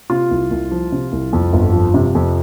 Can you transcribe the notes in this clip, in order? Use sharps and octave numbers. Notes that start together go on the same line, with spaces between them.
C3 F4
C2
C2
F3
C3
C2
F2
G1
F3
C3
F2